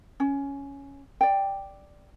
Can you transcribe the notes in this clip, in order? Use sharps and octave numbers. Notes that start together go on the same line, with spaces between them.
C#4
D5 G5